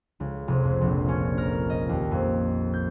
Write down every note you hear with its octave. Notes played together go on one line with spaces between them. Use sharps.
C#2
F1
F2
A#1
C#4
A#4
D#5
D#2
F2
G6